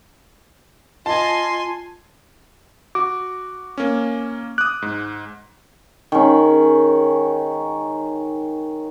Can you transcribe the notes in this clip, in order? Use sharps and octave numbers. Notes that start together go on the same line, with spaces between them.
F4 D#5 G#5 A5 C6
F#4 D6
A#3 C#4
D6 D#6 F#6
G#2
D#3 G#3 C#4